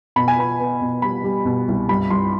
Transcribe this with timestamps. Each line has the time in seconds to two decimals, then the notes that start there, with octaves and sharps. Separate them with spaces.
0.16 B2 B5
0.28 G#5
0.38 B3 B5
0.59 B3
0.81 B2
1.02 G3 B5
1.24 G3
1.45 B2
1.68 C2
1.89 G2 B5
2.11 G2 C6